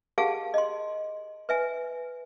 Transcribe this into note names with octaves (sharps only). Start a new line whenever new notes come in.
G4 G#4 A#4 F5 F#5 A5
D#5 C6
B4 E5 G#5